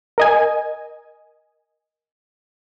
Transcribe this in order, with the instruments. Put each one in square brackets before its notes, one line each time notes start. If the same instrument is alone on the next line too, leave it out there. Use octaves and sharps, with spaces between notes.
[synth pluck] A#4 D#5 G#5